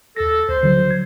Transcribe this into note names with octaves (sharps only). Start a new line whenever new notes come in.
D#2 A4 A#6
D2 C5
D3 F#3
G#6